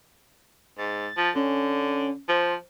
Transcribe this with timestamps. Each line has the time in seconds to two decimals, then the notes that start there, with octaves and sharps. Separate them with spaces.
0.78 G#2 A6
1.17 F3
1.36 D3 C#4
2.29 F3 C5